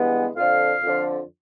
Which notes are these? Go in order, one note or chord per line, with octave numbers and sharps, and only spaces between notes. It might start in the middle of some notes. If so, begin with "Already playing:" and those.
Already playing: G2 E3 G#3 B3
F2 D3 F3 F5
F2 D3 F3